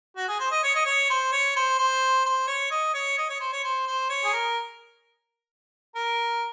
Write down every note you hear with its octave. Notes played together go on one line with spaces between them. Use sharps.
F#4
G#4
C5
D#5
C#5
D#5
C#5
C5
C#5
C5
C5
C5
C#5
D#5
C#5
D#5
C#5
C5
C#5
C5
C5
C#5
G#4
A#4
A#4